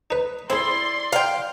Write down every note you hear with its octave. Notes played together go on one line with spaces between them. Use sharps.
D#4 B4
C4 E4 G#4 D5 C6
F5 G5